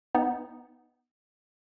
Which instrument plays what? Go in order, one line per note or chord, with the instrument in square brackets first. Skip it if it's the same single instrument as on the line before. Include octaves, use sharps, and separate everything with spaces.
[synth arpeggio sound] B3 D#4